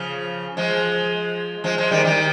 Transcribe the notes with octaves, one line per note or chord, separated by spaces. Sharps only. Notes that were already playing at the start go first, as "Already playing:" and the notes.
Already playing: C#3 F3
F3 G#3
F3 G#3
F3 G#3
D#3 G3
D#3 G3